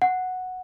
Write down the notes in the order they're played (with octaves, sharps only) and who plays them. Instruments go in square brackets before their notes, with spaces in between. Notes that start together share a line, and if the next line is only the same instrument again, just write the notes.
[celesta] F#5